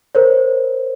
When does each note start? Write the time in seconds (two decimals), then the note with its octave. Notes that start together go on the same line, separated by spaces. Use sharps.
0.15 A#4 C5 C#5